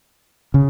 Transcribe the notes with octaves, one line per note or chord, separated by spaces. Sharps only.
C#3